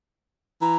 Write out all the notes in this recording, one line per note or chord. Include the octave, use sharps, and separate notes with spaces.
E3 A#5